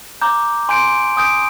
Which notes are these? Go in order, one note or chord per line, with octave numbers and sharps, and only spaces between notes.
A#5 D6 G6
G#5 C6 G6 D7
G#5 D#6 G6 D7